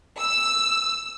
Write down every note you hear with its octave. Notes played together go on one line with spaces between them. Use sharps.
E6